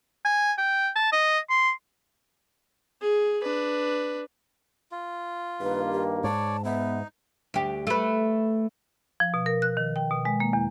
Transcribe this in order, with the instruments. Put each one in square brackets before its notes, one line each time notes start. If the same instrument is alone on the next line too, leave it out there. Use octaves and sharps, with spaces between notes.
[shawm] G#5
G5
A5
D#5
C6
[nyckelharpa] G#4
D4 B4
[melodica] F4
[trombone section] G2 D#3 A#3 [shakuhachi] B4
[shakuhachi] G4
[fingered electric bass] G#2 [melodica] C#5 D5 [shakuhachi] A5
[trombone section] B3 [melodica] D#4 [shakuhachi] E5
[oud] D2 G4
A3 B4
[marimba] F3
B2
A#4
F#6
D#3
G5
B2
G#3
A#3
E2